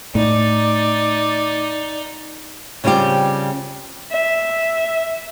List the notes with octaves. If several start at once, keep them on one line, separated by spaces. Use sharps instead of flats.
A2 D#4 D5
C#3 G3 C4 F4 G4
E5